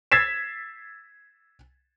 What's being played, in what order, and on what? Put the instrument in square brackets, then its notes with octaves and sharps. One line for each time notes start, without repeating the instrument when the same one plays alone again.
[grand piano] E6 G#6 A6 B6 C7 E7